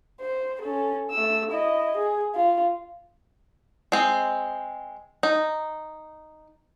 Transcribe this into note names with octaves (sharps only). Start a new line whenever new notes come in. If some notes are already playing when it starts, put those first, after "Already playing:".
C5
C#4 A4
A3 E6
E4 D#5
G#4
F4
G#3 C4
D#4